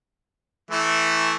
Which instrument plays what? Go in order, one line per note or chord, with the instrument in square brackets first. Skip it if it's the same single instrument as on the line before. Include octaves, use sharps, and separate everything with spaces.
[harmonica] E3 A3 E4